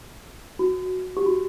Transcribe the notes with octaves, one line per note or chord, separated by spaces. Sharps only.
F#4
G4
F#4